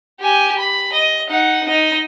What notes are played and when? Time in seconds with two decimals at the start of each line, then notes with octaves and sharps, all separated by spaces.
0.20 G4 G#5
0.59 B5
0.93 D#5
1.29 D#4 F#5
1.68 D#4 D#5